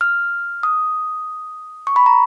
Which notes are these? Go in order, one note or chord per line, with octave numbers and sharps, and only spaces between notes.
F6
D#6
C#6
B5
A#5